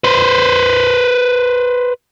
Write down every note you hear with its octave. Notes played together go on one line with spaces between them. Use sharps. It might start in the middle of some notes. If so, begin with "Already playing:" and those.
B4 C5